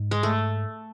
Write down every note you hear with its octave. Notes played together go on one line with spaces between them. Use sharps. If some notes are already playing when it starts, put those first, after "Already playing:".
Already playing: G#2
G#3
A3